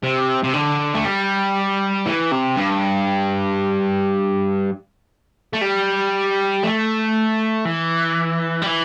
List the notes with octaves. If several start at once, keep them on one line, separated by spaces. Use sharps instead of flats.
C3
C3
D3
A3
G3
E3
C3
G2
A3
G3
A3
E3
G3
E3